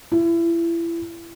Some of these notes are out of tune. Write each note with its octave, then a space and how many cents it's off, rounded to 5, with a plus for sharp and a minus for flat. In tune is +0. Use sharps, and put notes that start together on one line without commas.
E4 +30